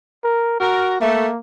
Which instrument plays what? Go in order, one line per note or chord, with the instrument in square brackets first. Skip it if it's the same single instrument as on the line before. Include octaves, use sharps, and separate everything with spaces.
[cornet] A#4
[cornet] F#4 [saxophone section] A#4
[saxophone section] A3 [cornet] A#3